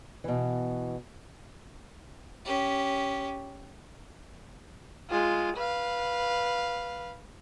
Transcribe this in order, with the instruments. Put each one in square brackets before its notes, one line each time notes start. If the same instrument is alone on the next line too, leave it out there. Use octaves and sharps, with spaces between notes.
[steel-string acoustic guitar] B2 E3
[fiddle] C#4 G4
[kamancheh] G#3 F4
B4 F5